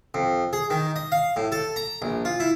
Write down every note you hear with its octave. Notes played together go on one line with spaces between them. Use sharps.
F2
G#4
D#3
D#5
F5
A2
A4
A#5
A#1
F4
E4